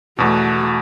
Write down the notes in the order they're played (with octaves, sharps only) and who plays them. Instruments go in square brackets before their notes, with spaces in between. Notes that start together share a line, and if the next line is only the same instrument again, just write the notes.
[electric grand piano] E2 B2 [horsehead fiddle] A3 F#4